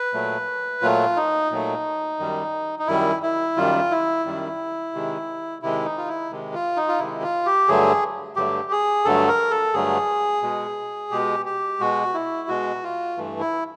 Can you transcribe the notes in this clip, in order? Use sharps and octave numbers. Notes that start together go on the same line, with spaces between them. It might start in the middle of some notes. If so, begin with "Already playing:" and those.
Already playing: B4
A#2 F#3 A3
A#2 F#3 A3 F4
D#4
A#2 F#3 A3
F#2 D#3 G3
D#4
F#2 D#3 G3 E4
E4
F#2 D#3 G3 F4
E4
F#2 D#3 G3
C3 D#3 G#3
C3 D#3 G#3 E4
D#4
F4
E4
C3 D#3 G#3
F4
D#4
F4
C3 D#3 G#3 E4
F4
G4
G2 D3 F#3 A3 G#4
G2 D3 F#3 A3 G4
G#4
G2 D3 F#3 A3 A4
A#4
A4
G2 D3 F#3 A3 G#4
B2 G#3
B2 G#3 G4
G4
B2 G#3 F#4
E4
B2 G#3 F#4
F4
G2 E3 A3
E4